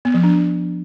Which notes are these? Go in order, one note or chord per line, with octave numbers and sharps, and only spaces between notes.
B3
F3
D4